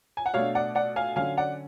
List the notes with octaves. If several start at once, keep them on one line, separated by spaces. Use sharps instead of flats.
G#5
F#5
B2 A3 D4 C#5 F5
D5 F#5
D5 F#5
F5 G#5
D3 F#3 C#4 F5 G#5
D5 F#5